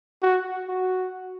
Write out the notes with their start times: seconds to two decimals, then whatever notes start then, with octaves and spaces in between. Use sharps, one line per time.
0.22 F#4
0.68 F#4